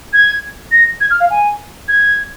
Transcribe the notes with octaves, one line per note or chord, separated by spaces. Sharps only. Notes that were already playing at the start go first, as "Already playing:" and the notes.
G#6
A#6
G#6
F6
F5
G#5
G#6